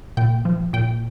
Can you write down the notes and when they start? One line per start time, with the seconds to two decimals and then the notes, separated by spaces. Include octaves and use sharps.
0.17 A#2 G5
0.45 F3
0.73 A#2 G5